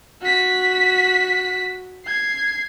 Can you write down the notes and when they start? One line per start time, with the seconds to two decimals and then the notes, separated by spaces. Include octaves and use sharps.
0.21 F#4 B6
2.06 G#6 C7